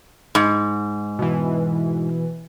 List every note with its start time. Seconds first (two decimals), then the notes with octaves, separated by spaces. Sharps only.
0.35 G#2
1.19 B2 E3